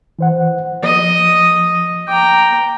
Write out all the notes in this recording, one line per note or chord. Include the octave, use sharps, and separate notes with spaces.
E3 C5 F#5
F3 D#5
G5 A#5 D6